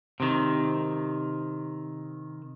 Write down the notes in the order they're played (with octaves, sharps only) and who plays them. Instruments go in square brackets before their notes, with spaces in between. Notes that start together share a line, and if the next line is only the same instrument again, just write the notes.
[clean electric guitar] C3 D#3